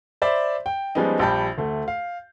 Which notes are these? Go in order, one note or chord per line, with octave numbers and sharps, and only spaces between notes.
C5 D5 E5 B5
G5
F3 G3 G#3 B3 C#4 D#4
A#1 G3 G5 A5 B5 G6
D2 A3
F5